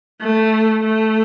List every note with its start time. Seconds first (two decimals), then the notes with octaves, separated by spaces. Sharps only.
0.21 A3
0.84 A3